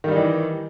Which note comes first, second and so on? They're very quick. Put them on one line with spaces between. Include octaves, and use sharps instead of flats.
D#3 G3 D#4 E3